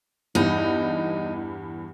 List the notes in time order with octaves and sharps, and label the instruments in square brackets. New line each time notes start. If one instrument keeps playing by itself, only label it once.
[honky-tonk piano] E2 G2 [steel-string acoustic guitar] D#4